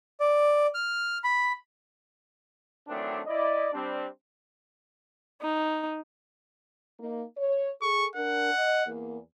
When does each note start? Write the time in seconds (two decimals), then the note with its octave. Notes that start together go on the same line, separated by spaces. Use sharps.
0.20 D5
0.74 F6
1.24 B5
2.88 D#3 E3 F#3 A3 C4 D4
3.26 E4 D5 D#5
3.73 G3 C4 D4
5.42 D#4
7.00 A#3 D#4
7.37 C#5
7.82 G#4 A4 C#6
8.16 D4 A#4 F#5
8.54 D#5
8.86 E2 A#3